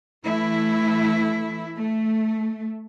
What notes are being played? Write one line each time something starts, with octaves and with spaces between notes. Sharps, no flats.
E3 A3 E4
A3